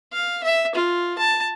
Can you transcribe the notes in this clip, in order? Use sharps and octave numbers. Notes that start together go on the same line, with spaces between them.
F5
E5
F4
A5